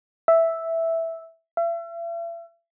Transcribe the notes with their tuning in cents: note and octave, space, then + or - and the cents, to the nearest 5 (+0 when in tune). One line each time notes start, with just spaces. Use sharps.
E5 -5
E5 +40